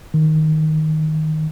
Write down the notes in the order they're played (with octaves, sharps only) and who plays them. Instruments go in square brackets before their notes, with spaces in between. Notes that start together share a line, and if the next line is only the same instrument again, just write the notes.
[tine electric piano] D#3